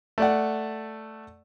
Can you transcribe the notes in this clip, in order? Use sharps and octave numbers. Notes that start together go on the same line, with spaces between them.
A3 D5 F#5